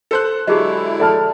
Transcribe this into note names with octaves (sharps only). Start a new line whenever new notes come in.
A4 C5 F#6
D3 F#3 G#3 E4 G4 G#4 D#5
A4 D5 A5 F6